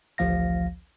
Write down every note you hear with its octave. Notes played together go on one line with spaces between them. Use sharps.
A1 D2 F3 F5 A#6